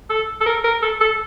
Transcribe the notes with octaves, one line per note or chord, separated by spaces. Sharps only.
A4
A4
A#4
A#4
A4
A4